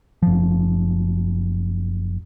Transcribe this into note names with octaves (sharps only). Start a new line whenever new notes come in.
F#1 F3